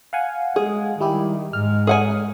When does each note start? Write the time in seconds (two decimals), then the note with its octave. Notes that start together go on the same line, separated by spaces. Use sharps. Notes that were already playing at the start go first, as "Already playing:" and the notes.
0.13 F5 F#5 G#5
0.56 G#3 G#4
1.00 D#3 G3 E4 G4
1.53 G#2 G#3 F6
1.87 G#4 F#5 G#5